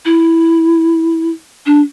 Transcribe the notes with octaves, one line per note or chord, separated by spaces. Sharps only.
E4
D4